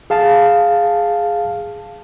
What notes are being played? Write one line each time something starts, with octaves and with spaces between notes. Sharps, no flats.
G#4 F5 A5